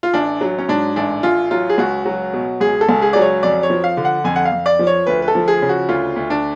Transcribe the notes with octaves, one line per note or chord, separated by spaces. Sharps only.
F4
A1 D4
F#3
C#4
G#2 D4
A1 D4
A1 F4
F#3 F4
G#4
C#2 F#4
F#3
B2
C#2 G#4
A4
C#2
G#4
F#3 D5
C#5
F2 D5
C#5
F3
F5
D3
F#5
F2 G#5
F#5
F5
F2
D5
F3
C#5
D2 B4
B4
A4
F3
G#4
C#3
F#4
D2 F4
D2
D4